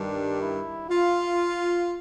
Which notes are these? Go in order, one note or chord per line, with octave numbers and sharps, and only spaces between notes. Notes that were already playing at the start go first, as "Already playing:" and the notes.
Already playing: G2 D#3 G3 D4
E4
F4